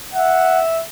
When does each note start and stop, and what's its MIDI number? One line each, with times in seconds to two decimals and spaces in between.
0.14 0.81 76
0.14 0.60 78